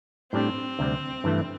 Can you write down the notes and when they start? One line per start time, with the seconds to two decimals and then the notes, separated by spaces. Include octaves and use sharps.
0.32 A2 G3 C4 D4 G4
0.79 D2 C3 G3
1.24 G2 E3 A3